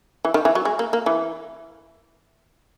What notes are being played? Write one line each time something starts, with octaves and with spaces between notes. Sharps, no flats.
E3
D#3
E3
F#3
G#3
A#3
A#3
E3